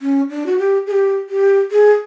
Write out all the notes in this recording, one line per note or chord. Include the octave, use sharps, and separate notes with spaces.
C#4
D4
F#4
G4
G#4
G4
G4
G#4